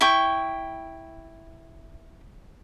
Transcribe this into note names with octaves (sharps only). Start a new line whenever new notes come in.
E4 G5 C#6